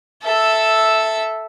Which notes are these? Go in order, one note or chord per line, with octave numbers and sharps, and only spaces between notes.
A4 E5